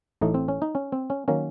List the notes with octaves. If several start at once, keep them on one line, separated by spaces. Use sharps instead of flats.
A1 A2 A3 D#4
C4
C#4
D#4
C#4
C4
C#4
D#3 F#3 A#3 C#4